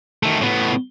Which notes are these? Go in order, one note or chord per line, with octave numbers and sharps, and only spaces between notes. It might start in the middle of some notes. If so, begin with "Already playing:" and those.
D#3 A3
A2 B3